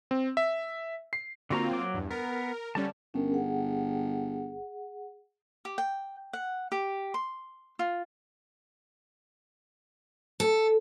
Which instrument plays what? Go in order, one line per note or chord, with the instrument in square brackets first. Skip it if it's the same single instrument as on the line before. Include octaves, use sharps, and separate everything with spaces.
[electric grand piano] C4
E5
C7
[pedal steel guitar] D3 F#4 A#5 [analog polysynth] A#3 C4 F4
[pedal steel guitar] F#3 D6
[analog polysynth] E2 G2
[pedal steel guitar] B3 [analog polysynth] A#4
[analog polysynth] D3 G3 C#4 [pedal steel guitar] D5 A5
[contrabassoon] G1 [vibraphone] C#4 A#4
[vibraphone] G#4 F#5
[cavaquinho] G4
G5
F#5
G4
C6
F4
[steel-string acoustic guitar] A4